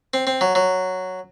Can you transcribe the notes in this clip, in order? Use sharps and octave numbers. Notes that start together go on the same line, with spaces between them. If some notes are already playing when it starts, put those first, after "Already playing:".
C4
C4
F#3
F#3